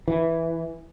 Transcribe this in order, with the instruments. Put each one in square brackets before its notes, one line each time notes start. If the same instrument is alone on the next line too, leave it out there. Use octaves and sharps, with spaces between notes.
[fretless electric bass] E3